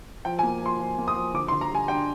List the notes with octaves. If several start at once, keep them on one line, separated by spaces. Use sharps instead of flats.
F3 G5
G#5
A#3
F3 C6
F3
A#3
D#6
F3
D3 D6
C6
D3
A#5
G3 G#5
D4 G5